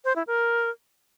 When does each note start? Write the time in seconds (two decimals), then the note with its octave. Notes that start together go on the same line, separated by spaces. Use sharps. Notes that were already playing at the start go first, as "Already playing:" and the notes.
0.05 C5
0.16 E4
0.27 A#4